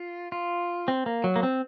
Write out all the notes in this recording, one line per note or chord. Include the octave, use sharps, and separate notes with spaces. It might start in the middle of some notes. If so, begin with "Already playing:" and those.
Already playing: F4
F4
C4
A#3
F#3
A#3
C4